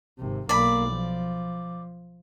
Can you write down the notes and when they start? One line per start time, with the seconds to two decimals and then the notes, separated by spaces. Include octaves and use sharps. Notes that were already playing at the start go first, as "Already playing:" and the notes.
0.18 G#1 C3
0.49 B1 A#3 D5 B5
0.91 F3